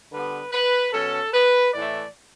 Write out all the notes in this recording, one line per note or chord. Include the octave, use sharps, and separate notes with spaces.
D3 G3 B3 B4
B4
B2 F#3 C#4 A4
B4
A2 E3 A3 D5